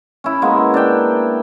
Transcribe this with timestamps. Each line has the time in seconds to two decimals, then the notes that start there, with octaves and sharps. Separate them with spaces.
0.24 C#4 E4
0.42 G#3 A#3 B3
0.74 D4 G5